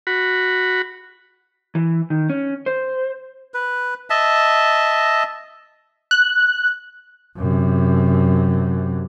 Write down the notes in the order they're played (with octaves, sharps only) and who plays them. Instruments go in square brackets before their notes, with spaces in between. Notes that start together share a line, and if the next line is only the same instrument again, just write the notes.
[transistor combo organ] F#4 B5
[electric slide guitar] E3
D#3
C#4
C5
[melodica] B4
D#5 E5 A5
[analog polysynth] F#6
[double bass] F#2 C3